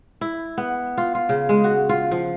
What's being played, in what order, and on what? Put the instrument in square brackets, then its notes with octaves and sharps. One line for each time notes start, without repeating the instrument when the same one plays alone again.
[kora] E4
B3
F4
F4
C#3
G#3
F#4
F4
F3